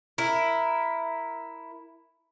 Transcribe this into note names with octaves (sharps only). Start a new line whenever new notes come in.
E4 A#4